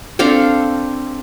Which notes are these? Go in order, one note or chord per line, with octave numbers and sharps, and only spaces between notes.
C4 D4 A4 F5